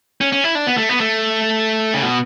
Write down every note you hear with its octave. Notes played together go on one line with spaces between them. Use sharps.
C#4
C#4
E4
D4
B3
A3
B3
A3
C#3
B2